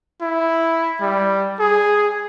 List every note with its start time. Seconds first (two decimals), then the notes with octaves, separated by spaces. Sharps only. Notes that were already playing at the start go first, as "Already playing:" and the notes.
0.22 E4
1.01 G3
1.60 G#4